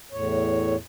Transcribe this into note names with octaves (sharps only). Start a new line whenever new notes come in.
E2 A2 C#5